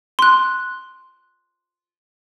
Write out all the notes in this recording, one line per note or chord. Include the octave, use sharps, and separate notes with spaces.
C6 F#6